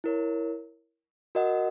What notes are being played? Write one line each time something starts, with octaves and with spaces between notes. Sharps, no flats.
E4 A#4 C#5
F#4 A#4 D#5 F#5